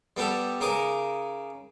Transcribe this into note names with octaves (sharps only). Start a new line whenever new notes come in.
G3 B3 G4 A4
C#3 D#4 A#4 D6 D#6